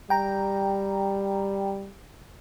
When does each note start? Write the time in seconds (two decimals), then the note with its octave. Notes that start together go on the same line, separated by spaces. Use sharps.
0.10 G3 G5 A#5